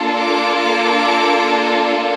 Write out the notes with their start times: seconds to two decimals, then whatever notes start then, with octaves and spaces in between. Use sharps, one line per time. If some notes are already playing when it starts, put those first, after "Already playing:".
Already playing: A#3 D4 F4 A4
0.18 D6
0.59 D6